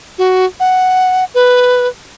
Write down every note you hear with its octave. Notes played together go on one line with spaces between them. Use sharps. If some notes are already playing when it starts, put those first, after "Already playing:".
F#4
F#5
B4